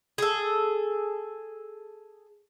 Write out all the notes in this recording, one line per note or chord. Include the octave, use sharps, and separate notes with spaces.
G#4 A4